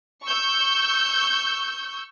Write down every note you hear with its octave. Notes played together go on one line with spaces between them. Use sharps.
C#6 E6 G6